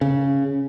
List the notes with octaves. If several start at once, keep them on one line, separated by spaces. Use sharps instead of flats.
C#3